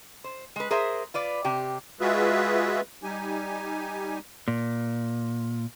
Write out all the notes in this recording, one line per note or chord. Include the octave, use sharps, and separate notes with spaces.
C5
G#3 B4
G#4 A#4 C5 E5
F4 B4 D5
C3 G4
G#3 F4 F#4 G#4 B4 E5
G3 D#4 G4 G#5
A#2